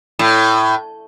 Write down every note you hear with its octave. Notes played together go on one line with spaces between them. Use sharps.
A2